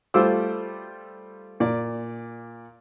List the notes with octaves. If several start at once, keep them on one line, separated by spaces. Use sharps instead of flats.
G3 A3 F4 C5 D6 E6
A#2 D5